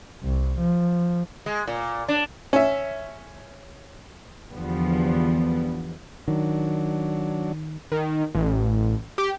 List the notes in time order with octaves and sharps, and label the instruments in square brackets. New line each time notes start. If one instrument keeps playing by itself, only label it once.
[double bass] C2
F3
[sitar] G#3
A#2
D4
[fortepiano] C#4 E5
[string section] E2 D3 F3 G3 B3
[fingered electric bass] D#3 [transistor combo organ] F#3 D4
[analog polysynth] D#3
A1
G4